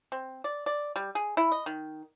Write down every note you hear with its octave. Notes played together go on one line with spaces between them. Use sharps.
C4
D5
D5
G3
G#4
E4
D#5
D#3